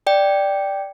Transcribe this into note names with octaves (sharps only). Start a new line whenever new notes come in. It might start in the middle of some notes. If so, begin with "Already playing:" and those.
D5 G5